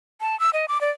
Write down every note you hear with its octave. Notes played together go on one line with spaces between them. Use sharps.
A5
E6
D#5
D6
D5